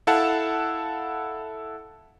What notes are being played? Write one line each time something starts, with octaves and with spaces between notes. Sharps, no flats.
E4 A4 F5 F#5 A5